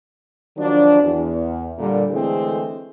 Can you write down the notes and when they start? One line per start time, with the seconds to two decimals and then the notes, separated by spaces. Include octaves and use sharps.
0.57 D#3 F3 F#3 D4
1.02 E2
1.79 A#2 D3 G3
2.11 D3 E3 G#3 A3 C4 G#4